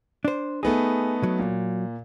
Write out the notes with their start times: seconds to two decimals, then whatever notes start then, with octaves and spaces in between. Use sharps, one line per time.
0.25 D4 C5
0.63 A3 B3 D#4 G#4
1.23 F#3
1.39 A#2